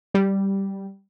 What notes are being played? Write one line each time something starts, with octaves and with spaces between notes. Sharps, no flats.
G3